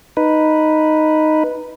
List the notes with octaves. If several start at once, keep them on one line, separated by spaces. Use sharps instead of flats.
D#4 B4